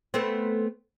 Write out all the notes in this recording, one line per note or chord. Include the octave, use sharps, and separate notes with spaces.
A3 B3 C4